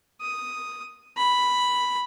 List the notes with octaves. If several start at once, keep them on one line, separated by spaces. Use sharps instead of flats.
D#6
B5